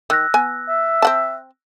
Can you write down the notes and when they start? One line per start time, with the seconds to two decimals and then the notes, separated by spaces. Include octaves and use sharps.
0.10 D#3 E6 F#6 A#6
0.34 B3 G#5
0.69 E5
1.02 C4 F#5 A5